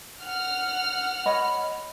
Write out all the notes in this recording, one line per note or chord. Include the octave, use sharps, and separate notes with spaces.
F#5 F6
C#5 D#5 B5